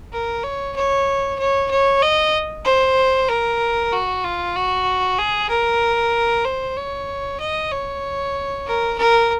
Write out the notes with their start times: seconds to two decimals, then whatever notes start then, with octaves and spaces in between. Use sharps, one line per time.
0.13 A#4
0.44 C#5
0.76 C#5
1.39 C#5
1.71 C#5
2.02 D#5
2.65 C5
3.29 A#4
3.93 F#4
4.24 F4
4.56 F#4
5.19 G#4
5.50 A#4
6.45 C5
6.77 C#5
7.40 D#5
7.72 C#5
8.67 A#4
8.98 A#4